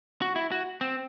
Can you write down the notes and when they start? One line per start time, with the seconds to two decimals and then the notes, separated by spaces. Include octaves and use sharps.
0.22 F#4
0.36 E4
0.52 F#4
0.81 C4